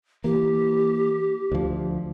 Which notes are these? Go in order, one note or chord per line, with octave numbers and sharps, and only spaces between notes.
E3 A#3 G4
D2 F3